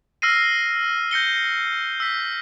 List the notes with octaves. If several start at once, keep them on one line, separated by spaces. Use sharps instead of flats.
E6 F6 A#6 C7 D#7
G6 A#6 C#7 G7
E6 B6